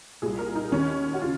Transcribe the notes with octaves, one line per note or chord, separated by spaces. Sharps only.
C2 A#2 G#4
A#4
D#4
D#2 D#3 C#4
F#4
C#3 F4